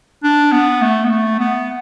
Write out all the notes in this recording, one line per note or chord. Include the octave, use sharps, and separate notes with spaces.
D4
B3
A3
B3
A3
B3